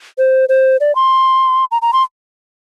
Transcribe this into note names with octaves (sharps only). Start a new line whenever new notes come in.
C5
C5
D5
C6
A#5
A#5
C6